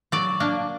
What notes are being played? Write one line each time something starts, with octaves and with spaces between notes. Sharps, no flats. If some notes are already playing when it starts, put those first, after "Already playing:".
F#3 D5
A#3 D4